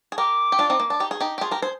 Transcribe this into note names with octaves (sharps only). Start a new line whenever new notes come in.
G#4
G4 A#4 D6
G4
D4 F4
C4 D#4
A#3
D4
D#4 G4
G#4
D#4 G4
G4
F4 G#4 C6
G4 A#4
G#4 C5